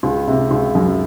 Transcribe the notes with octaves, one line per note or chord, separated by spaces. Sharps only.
C#2
C3
C#2
F#2